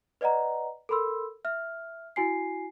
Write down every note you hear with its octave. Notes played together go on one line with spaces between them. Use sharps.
B4 D5 D#5 F#5 A#5
A4 A#4 B5 C6 E6
E5 F6
E4 F#4 G#5 C7